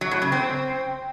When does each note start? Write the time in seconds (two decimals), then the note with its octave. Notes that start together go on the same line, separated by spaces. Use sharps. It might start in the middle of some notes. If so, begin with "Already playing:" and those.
0.01 F#3
0.11 A2
0.22 C#3
0.32 C4